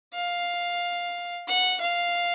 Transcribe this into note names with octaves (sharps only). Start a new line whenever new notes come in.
F5
F#5
F5